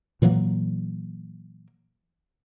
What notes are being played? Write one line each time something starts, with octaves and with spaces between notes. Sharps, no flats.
A#2 E3 F#3 A#3